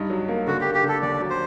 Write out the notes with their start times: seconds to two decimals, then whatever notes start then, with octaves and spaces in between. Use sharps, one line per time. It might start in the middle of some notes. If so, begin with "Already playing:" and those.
Already playing: G2 D#4
0.10 F#3
0.28 A#3
0.47 D3 F#4
0.61 G4
0.65 A#3
0.74 G4
0.83 D3
0.89 A4
1.02 D#2 D5
1.20 F#3
1.30 C5